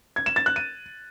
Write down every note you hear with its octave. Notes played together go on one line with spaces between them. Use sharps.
G#6
E7
A6
F#6
D#7